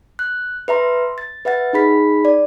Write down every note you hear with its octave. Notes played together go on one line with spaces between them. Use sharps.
F#6
B4 E5 A#5 C6
A6
B4 E5 F#5 A6
D#4 G#4 B5 B6
D5